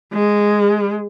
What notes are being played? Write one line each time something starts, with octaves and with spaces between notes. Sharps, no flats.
G#3